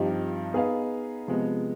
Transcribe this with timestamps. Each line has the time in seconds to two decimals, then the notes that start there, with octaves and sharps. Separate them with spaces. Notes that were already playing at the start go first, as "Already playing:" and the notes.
Already playing: G2 F3 C4 D#4 G4
0.53 B3 D#4 G#4 B4 F5
1.27 C3 F3 G#3 B3